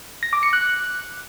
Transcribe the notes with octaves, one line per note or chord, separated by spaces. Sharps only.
A#6
D6
C#7
F#6